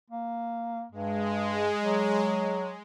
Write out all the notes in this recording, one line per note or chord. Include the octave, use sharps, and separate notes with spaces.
A#3
G2 G#3
F#3